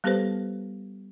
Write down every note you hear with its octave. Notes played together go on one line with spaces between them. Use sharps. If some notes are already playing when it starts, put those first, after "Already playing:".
G3 B3 G4 A4 B4 C5